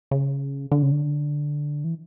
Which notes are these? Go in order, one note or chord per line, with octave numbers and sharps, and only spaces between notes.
C#3
D3
C#3
D3
E3